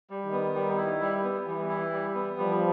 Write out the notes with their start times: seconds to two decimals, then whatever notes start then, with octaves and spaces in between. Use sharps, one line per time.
0.10 G3
0.25 D#3
0.32 B3
0.55 G3
0.78 E4
1.01 G3
1.24 B3
1.46 E3 G3
1.69 E4
1.92 G3
2.14 B3
2.37 F3 G3